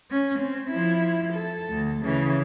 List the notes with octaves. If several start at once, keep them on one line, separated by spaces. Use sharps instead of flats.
C#4
C4
F3 E4
A4
D2
C#3 E3